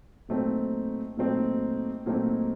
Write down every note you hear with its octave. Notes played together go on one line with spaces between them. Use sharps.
A#2 F#3 A3 C4 D#4
A#2 F#3 A3 C4 D#4
A#2 F#3 A3 C4 D#4